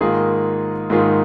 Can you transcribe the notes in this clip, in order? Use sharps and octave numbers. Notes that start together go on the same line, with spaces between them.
G#2 D#3 A#3 F4 G#4
G#2 D#3 A#3 F4 G#4